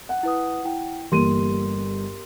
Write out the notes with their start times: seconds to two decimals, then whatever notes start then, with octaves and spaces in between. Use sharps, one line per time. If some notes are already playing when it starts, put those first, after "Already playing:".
0.09 F#5
0.23 E4 B4 D#6
0.65 E4 G5
1.12 G1 E3 A#3 G4 A#4 C6 D#7